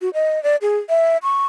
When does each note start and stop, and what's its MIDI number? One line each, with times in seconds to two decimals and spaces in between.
0.02 0.10 66
0.14 0.42 75
0.43 0.56 74
0.62 0.78 68
0.89 1.17 76
1.23 1.46 85